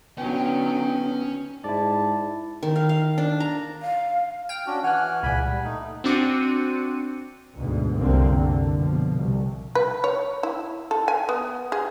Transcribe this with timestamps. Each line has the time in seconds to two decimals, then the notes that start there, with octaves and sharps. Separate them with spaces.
0.18 D3 F#3 B3 C#4 D#4 G5 G#5
1.64 G#2 E4 D5 A5
2.63 D#3
2.76 F5
2.89 F5
3.18 D4
3.40 A#5
3.82 F5
4.49 G5 F6
4.66 C#4 D4 F#4
4.84 E3 F#5 G#5 F6 F#6
5.23 C#2 A#2 G#5 B5
5.44 G3
5.64 A3 D#4
6.04 C4 D4 F#4 D6 C#7 D#7
7.57 D2 G#2 B2
7.97 C2 F#2 D3 A#3 C4
8.33 D3
8.78 B2 F3
9.14 C2
9.75 B4
10.04 C#5
10.43 E4
10.91 A4
11.08 G#5
11.29 B3
11.72 G#4